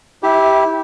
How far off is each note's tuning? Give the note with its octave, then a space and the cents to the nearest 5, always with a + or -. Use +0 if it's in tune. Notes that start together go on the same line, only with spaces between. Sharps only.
E4 -25 G4 +0 E5 +0